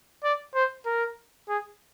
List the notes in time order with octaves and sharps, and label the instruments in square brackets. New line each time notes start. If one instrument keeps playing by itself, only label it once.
[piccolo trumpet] D5
C5
A#4
G#4